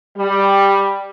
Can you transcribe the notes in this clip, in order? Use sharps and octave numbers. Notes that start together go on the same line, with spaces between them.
G3